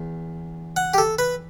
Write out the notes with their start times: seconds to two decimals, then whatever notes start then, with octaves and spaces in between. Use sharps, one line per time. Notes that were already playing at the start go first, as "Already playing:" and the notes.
Already playing: E2
0.77 F#5
0.94 G4
0.98 A4
1.19 B4